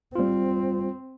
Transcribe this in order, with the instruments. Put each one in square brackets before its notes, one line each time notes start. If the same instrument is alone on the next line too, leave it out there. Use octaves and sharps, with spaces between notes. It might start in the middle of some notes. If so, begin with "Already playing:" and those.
[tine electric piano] G3 F4 [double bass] C4